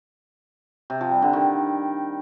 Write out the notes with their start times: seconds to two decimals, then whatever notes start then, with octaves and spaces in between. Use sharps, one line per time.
0.90 C3
1.01 F3
1.11 G3
1.22 D3
1.33 D#3